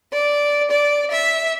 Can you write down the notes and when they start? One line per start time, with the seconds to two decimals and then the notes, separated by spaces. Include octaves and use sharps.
0.12 D5
0.71 D5
1.11 E5